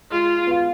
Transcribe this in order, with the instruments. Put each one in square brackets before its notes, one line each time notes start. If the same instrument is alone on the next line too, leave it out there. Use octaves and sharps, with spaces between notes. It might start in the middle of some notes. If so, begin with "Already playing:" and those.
[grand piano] G#3 [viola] F4
[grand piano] B3 F4